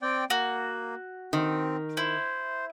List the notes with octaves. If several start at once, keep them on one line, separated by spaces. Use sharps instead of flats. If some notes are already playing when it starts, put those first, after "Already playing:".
C4 D5 G5
A#3 F#4
D#3 C4
E4 C5